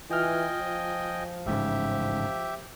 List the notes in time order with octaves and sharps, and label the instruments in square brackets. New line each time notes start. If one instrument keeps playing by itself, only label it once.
[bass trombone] E3 [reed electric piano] F4 F6 [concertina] D#5 G5 G#5
[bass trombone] F3
[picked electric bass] A1 G#2 C#3 [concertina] G4 E5